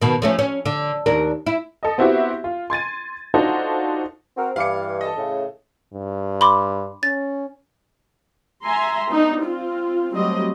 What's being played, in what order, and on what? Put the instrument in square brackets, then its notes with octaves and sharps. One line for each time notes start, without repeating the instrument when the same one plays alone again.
[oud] B2 D#3
F3 A3 C#4
C#4
D3
D#2 D4 A#4
E4
[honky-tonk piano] A4 D#5
B3 C4 E4 F#4 G4 E5
F4
C6 G#6 A6 D#7
D4 D#4 F4 F#4 A4 C5
[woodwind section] C4 F#4 A#4
[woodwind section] G2 E3 [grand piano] F5 D6 C#7
[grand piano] A4 D#5
[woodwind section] A2 C#3
[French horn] G2
[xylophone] B5 C6 D6
[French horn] C#4 [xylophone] A6
[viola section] E5 G#5 A#5 C6
B3 D4 D#4
C4 F4
F#3 G3 A3 C4 D#5